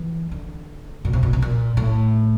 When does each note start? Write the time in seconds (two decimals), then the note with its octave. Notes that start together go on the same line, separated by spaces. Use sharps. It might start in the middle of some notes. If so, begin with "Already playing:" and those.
Already playing: E3
0.31 D3
1.05 A#2
1.13 C3
1.23 A#2
1.33 C3
1.42 A#2
1.77 A2